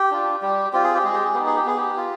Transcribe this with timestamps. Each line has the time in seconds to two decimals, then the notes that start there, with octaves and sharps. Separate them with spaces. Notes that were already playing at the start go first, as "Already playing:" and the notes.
Already playing: G4
0.11 D4 F4
0.42 G3 G4
0.73 C4 F4 G4
0.84 G#4
0.95 G4
1.04 G#3 G#4
1.14 G4
1.25 G#4
1.34 B3 D#4 G4
1.46 G#4
1.56 G4
1.66 B3 G#4
1.77 G4
1.97 F4